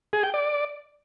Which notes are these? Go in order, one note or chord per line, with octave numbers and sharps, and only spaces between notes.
G#4
G5
D5